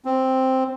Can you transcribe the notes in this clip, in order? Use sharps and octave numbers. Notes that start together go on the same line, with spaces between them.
C4